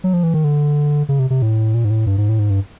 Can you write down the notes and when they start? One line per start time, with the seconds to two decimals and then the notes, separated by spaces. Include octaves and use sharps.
0.04 F#3
0.13 F3
0.23 E3
0.34 D#3
0.44 D3
1.09 C#3
1.19 C3
1.30 C3
1.42 A2
1.74 A#2
1.85 G#2
1.90 A2
2.06 G2
2.18 G#2
2.29 A2
2.39 G#2
2.50 G2